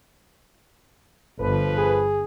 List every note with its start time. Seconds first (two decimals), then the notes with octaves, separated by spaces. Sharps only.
1.39 G1 D3 F3 A4 B4
1.78 G2 G#4